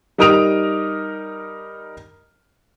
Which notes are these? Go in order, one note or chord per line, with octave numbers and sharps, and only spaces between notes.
G3 D#4 A#4 D#6 D7 F7